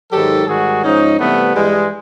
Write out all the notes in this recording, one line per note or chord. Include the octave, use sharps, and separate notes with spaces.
G#2 D#3 F#3 G4 A4
G#2 D#3 G3 F#4 G#4
G#2 F3 C#4 D#4
C3 E3 G3 A3 B3
G2 E3 G3 G#3